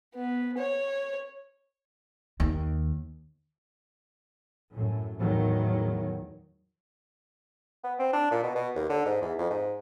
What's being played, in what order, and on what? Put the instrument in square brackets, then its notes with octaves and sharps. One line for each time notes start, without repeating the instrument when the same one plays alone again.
[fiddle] B3
C#5
[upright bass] D#2
[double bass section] F#2 A2
E2 A2 D#3 F#3
[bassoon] B3
C4
D4
A#2
B2
B2
D#2
D3
G#2
E2
F2
G#2